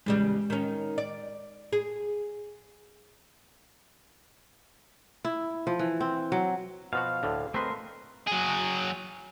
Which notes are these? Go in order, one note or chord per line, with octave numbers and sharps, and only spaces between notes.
E2 C#3 G3 G#3
D#3 C#4
D5
G#4
E4
F3
E3
C4
F#3
B2 F3 F#4 F5
D2 A2 D3
A3 C4 A#4 B4 D#5 C6
F#3 G#4